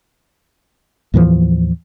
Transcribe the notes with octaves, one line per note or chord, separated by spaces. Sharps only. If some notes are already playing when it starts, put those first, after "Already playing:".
D#2 A2 E3 F3